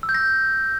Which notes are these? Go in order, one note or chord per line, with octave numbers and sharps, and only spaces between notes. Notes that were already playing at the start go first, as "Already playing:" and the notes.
E6
G6
A#6